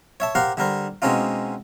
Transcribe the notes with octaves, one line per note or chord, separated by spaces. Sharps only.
C#5 E5 A5
G4 A#4 C5 F5 F#5
D3 G3 A#4 C5
B2 G#3 C4 C#4 D#4 F4